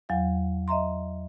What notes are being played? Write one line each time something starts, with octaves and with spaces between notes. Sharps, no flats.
E2 F#3 F5 F#5
D#5 E5 A#5 C6